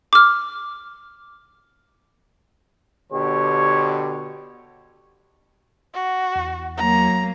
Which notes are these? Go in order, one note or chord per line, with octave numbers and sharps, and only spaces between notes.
D6 F6
B2 D3 G4 C#5
F#4
E2
F#3 A#3 A#5